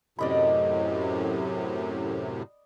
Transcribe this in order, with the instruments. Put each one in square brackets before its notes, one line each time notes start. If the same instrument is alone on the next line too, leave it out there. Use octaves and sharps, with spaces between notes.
[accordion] F#2 A2 C3 [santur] D5 D#5 B5